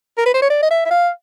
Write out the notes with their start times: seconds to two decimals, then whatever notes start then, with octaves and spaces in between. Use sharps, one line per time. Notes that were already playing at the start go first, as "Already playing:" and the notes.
0.17 A#4
0.26 B4
0.34 C5
0.42 C#5
0.50 D5
0.62 D#5
0.71 E5
0.86 E5
0.91 F5